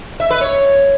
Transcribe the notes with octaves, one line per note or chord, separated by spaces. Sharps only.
E5
B4
C#5